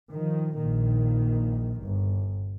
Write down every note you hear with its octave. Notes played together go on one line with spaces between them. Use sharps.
D#3 F3
A#1 A#2 D#3
G1